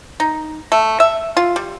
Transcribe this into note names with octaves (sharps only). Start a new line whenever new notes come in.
D#4
A3
E5
F4
G3